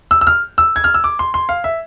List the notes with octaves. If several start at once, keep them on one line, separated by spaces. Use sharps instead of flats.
E6
E6
F6
E6
G#6
F6
E6
D6
C6
C6
F5
E5